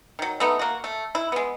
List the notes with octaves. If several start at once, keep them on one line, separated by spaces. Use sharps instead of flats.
D#3 F#3
A3 B3 D#4
A#3 F#4
A3
E4
G#3 B3